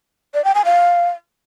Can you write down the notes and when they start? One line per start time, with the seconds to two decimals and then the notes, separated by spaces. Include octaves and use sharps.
0.34 D5
0.44 G5
0.55 G#5
0.65 F5